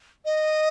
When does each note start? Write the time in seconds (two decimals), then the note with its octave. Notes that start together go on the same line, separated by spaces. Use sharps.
0.25 D#5